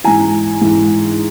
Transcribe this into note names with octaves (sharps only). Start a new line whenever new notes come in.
G#2 E3 G#5 A#5
G#2 E3